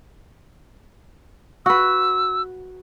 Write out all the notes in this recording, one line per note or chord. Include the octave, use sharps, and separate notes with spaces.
F#4 B4 E6